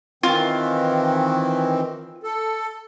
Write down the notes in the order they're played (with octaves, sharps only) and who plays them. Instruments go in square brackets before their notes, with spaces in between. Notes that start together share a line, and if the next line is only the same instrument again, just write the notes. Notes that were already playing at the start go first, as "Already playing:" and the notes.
[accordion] D#3 E3 C4 [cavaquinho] F4
[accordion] A4